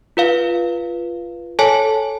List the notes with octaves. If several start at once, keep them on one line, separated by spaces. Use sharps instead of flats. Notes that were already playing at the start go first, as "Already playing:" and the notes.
F4 B4 F5
A4 C#5 G#5 A5